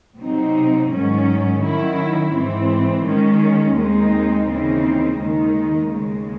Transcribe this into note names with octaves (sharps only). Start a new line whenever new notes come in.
C3 F#3 C4 D#4
G#2 D#3 F#3 C#4
D#3 F#3 C#4 E4
G#2 E3 C4
D#3 G#3 C#4
D#2 D#3 G#3 C4 D#4
D#2 C#3 E3 C4 D#4
D#2 D#3 G#3 D#4
D#2 C#3 G#3